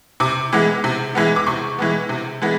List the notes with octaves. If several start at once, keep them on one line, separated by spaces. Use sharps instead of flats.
C3 D6
E3 G#3 B3
C3
E3 G#3 B3
D6
C3 C#6
E3 G#3 B3
C3
E3 G#3 B3